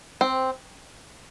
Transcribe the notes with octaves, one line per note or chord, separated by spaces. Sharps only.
C4